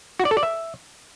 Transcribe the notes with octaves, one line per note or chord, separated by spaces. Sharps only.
F#4
D5
A4
D5
E5